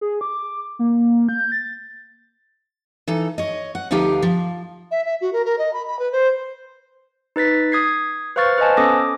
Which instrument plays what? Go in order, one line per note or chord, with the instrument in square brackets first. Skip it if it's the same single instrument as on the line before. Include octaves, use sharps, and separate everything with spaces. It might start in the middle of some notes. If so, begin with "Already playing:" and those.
[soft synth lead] G#4
D6
A#3
G6
A6
[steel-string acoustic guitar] E3 D#4 A4
C#5 D#5
F#5
D2 F3 B3 D#4 G4 F5
F3
[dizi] E5
E5
F#4
A#4
A#4
D#5
B5
B5
B4
C5
[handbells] D#4 B4 A6 B6
D#6 G#6 C7
B4 C5 F5 C#6 F6 A6
B4 C5 D#5 G#5 A5
B3 C#4 A4 D6 D#6 A#6